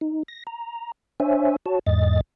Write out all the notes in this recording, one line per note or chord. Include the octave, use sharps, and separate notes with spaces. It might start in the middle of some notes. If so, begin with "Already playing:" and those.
D#4
A#6
A#5
D4 C5 C#5 E5 G#5
F#4 C#5 A5
E2 G#2 D#5 A6